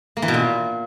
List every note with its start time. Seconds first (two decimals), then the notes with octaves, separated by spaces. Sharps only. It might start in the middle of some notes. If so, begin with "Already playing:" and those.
0.17 A#3
0.22 E3
0.28 B2
0.34 A#2